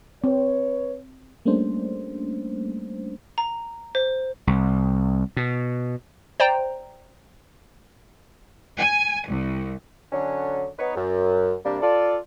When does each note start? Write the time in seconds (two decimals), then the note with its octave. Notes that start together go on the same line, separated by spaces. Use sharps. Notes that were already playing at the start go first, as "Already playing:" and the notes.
0.24 C4 B4 C#5
1.45 G3 A3 A#3 C#4 D4 C5
3.38 A#5
3.95 C5
4.47 C2
5.37 B2
6.40 C5 D5 G5 A#5
8.78 G#5
9.29 C2
10.12 D3 F#3 C#4 D4
10.79 B3 D#4 B4 C#5
10.95 F#2
11.64 C3 G3 A#3 D4
11.82 F4 A4 D5